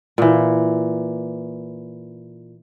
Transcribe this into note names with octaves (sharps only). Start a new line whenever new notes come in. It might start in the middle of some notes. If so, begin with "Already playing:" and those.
A#2 E3